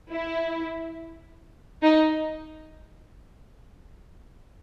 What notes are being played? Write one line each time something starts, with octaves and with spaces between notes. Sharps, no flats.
E4
D#4